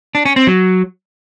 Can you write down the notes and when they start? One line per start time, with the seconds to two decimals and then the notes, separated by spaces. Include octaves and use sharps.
0.15 D4
0.25 C#4
0.36 C4
0.47 F#3